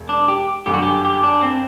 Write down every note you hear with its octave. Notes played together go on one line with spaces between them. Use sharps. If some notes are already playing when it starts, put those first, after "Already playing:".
Already playing: E1
D4
G4
G1 F#2 D3 G4
F#4
G4
G4
D4
C4